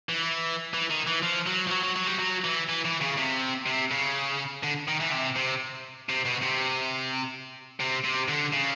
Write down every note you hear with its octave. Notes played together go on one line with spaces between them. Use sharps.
E3
E3
D#3
E3
F3
F#3
F3
F#3
F#3
F#3
G3
F#3
E3
E3
E3
C#3
C3
C3
C#3
D3
D#3
E3
C3
C3
C3
B2
C3
C3
C3
D3
C#3